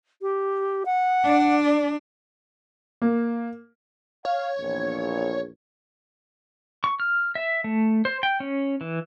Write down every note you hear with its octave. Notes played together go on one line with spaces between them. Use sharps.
G4
F#5
D4 D5
A#3
C#5 F5
A#1 E2
C#6
F6
E5
A3
C5
G5
C#4
E3